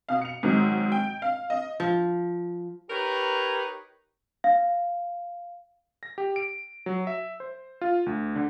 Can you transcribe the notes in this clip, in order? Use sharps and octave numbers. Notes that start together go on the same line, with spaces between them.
B2 F5
C#7 F7
G#2 D#3 F#3 C4
G5
F5
D#5
F3
D#4 G4 A#4 B4 C#5
F5
A#6
G4
D7
F#3
E5
C5
F4
D2
D3